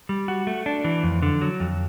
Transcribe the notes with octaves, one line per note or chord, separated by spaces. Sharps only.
G3
F#4
A3
D4
E3
F2
D3
F#3
F2